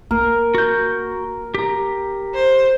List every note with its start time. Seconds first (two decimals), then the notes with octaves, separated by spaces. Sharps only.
0.11 A#3 A#4
0.55 F#4 G6
1.55 G4 A#5
2.35 C5